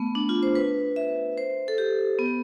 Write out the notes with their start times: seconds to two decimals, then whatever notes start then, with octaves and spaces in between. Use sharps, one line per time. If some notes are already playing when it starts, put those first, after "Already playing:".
Already playing: A3 B3
0.15 D4
0.29 F4
0.43 C5
0.55 B4
0.96 E5
1.38 C5
1.68 A4
1.78 G4
2.19 B3